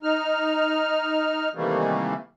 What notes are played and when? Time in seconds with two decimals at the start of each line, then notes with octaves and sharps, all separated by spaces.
0.03 D#4 F6
1.55 C3 D#3 E3 G3 A3 A#3